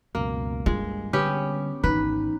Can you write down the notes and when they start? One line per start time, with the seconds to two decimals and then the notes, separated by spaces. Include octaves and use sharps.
0.15 C#2 F#2 B2 A#3
0.66 G2 G#3 F4
1.13 D3 G3 B3 C#4 G4
1.84 G#1 E3 D#4 B4